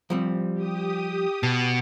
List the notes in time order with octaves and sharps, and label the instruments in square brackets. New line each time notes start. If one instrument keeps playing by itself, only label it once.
[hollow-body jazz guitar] F3 G3 C4
[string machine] G4 D#6
[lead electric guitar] B2 [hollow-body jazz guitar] A5